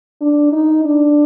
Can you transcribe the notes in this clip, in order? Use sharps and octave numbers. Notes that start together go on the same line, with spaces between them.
D4
D#4
D4